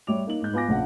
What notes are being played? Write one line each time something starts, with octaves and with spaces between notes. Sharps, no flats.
G3 C#5 E5 D6 F7
A#3 D#4 F#7
G#2 G6
B3 F4 G#5 D6 A#6
A#1 C#3 F4 F#5